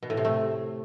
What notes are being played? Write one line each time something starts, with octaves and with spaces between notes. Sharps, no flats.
B2
A2
C3
A3